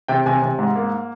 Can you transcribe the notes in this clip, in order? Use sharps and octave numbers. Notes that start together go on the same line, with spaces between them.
C3 G5
C3 G#5
C3
G#2
A#3